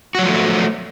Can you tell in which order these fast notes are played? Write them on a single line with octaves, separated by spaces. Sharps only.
F#4 F#3 F3 A3